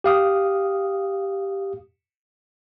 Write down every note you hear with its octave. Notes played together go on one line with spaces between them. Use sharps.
G4 F5 D#6